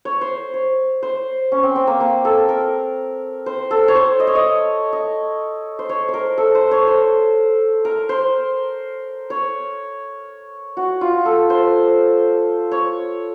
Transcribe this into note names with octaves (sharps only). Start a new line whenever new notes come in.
C#5
C5
C#5
C5
C#4
C4
C4
A#3
A#3
A4
A#4
C5
A4
C#5
C5
D#5
C#5
D#5
D#5
C5
C#5
C5
A#4
A4
C5
C#5
C5
A#4
C5
C#5
F#4
F4
A4
C5
C#5